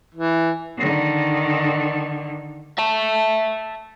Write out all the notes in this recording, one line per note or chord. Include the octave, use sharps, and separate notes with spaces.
E3
D3 D#3
E5 A5